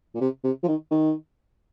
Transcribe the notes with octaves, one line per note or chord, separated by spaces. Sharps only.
A#2
C3
C3
F3
D#3
D#3